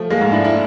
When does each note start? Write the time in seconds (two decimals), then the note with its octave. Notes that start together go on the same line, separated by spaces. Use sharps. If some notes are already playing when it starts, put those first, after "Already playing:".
Already playing: F3 A3
0.10 G#3 A#3
0.21 G#2
0.32 D4 E4
0.44 E4